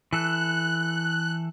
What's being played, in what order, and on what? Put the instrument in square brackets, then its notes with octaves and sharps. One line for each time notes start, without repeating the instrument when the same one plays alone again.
[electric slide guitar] E3 A4 [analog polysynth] F#6